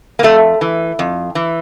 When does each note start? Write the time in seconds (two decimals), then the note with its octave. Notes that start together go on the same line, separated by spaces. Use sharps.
0.19 A#3
0.23 F2 A3
0.61 E3
0.99 F2
1.35 E3